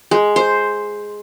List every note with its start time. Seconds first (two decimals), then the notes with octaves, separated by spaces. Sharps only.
0.11 G#3
0.36 C5